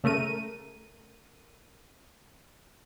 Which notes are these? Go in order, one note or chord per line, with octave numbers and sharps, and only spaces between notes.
C#3 A3 A#4 D#7